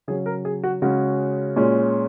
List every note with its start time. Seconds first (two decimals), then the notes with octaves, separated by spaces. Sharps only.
0.08 C#3 F#3 C#4 G#4
0.26 A#4
0.45 G#4
0.64 F#4
0.82 C#3 G#3 C#4 F#4
1.56 A#2 G#3 C#4